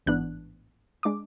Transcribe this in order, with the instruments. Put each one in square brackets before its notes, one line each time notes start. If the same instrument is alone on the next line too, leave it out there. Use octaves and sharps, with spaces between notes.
[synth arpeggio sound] A1 G#2 E3 B3 D4 F#6
G#3 D4 D6